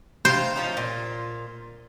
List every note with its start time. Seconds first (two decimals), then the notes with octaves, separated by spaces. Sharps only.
0.25 C3 D#4 C5 F5
0.56 F3 C#4 D#4
0.77 A#2 F4